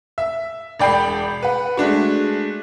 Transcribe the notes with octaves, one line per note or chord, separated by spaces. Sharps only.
E5
E1 D5 G5 B5 C7
B4 F#5
G#3 A3 D4 F#4